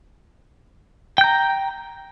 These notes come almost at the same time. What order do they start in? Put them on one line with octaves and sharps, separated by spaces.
G5 G6 A#5